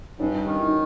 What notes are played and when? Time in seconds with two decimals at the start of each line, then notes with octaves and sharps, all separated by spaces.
0.19 G2 C#4 D#4
0.46 D#3
0.59 E4
0.66 D#4